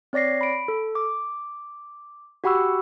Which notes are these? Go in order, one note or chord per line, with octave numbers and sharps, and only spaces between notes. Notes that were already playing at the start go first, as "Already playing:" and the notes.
C4 C#5 D5 A#6 C7
B5 D7
A4
D6
F#4 G4 F#5 B5 C#6 E6